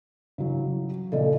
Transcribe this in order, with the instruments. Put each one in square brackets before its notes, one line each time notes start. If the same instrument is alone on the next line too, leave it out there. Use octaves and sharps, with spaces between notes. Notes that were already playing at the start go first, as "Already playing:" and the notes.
[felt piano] C#3 E3 F#3
[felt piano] A#2 C#3 F3 [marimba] A4 D5 D#5